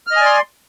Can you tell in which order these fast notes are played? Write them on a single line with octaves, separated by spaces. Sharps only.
F6 D#5 G#5 D5 C6